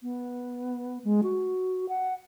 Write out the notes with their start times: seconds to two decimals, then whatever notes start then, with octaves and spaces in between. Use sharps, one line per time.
0.03 B3
1.04 G#3
1.23 F#4
1.88 F#5